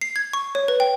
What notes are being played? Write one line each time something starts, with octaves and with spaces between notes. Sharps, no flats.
C7
G#6
C#6
C#5
B4
G5